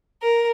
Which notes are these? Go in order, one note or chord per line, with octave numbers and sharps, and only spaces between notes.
A#4